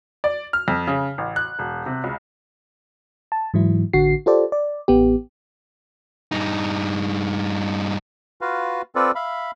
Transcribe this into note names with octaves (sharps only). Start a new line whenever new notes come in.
D5
F6
F2
C#3
A1
F#6
E1
C3
C#2
A5
G#2 E3 F#3 E4
A1 D3 F#4 C7
F4 G4 A4 C5 D5
D5
A1 B3 G4
G2 D#4
F4 F#4 B4 F5
C4 F4 A4 B4 D5
E5 F5 B5